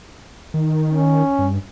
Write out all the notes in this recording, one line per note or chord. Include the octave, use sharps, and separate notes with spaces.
D#3
C#4
G2